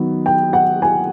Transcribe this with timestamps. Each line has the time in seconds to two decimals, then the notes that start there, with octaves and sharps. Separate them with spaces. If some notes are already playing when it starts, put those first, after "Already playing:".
Already playing: D#3 F#3 B3
0.26 G5
0.53 F#5
0.82 G#5